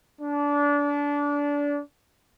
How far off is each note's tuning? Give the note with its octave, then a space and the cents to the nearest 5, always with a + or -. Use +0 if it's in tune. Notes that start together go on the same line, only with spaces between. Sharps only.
D4 -25